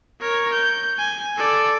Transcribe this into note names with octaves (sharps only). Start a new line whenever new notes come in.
A#4 C#5
G6
G#5
A4 D5